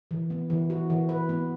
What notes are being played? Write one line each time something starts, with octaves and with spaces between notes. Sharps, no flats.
E3
B3
E3
F#4
E3
B4
B3